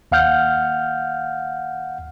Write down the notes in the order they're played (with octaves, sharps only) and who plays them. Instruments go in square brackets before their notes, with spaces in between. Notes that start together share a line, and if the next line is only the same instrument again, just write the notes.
[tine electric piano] D#2 F5 F#5 F6 G6